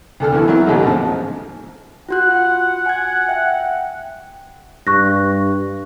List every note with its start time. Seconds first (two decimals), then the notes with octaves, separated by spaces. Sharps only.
0.20 D2 D3 A4 F6
0.32 E2 E3 E4
0.47 D#3 F#3 C4 E4
0.66 A1 D#2 B2 D3 F#3 G#3
0.83 G#2 C#3 F3
2.09 F4 F#4 F#5 F#6
2.86 G#5 G#6
3.29 E5 G5
4.87 G2 C#6 F#6 A#6